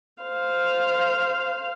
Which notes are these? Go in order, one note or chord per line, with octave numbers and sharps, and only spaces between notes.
C5 F5